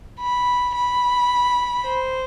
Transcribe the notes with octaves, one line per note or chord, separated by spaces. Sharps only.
B5
B5
C5